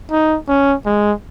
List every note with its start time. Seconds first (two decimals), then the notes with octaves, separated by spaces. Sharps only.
0.11 D#4
0.48 C#4
0.86 G#3